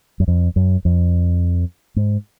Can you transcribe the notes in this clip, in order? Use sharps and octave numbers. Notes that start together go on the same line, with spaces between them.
F#2
F2
F#2
F2
G#2